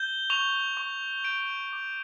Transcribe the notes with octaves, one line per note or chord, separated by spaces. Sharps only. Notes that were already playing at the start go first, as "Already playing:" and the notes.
Already playing: G6 G7
C#6 F7
C#6
G6 D7
D6